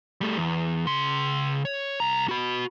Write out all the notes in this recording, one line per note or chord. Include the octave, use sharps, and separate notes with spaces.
G3 A3
E2
C#3 C6
C#5
C2 A#5
F#4 B5